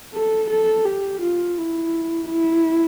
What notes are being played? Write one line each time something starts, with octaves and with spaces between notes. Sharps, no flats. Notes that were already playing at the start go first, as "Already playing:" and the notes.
A4
A4
G4
F4
E4
E4